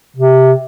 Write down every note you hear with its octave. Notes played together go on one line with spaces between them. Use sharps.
C3